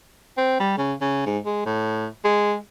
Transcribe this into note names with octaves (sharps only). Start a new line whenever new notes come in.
C4
G3
C#3
C#3
G#2
G#3
A2
G#3